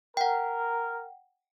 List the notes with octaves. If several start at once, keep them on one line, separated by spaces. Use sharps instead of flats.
A#4 F#5 G5